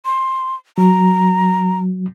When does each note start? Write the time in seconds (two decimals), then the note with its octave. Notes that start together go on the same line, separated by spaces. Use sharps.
0.05 C6
0.78 F#3 A#5